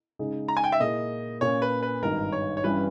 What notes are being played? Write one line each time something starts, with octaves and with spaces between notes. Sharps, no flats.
C#3 G#3 D#4 G#4
A#5
G#5
G5
E5
A#2 A#3 E4 G#4 D#5
A#2 A#3 C#4 C#5
B4
B4
G#1 G2 D#3 A#4
C#5
C#5
G2 E3 G3 C#4 B4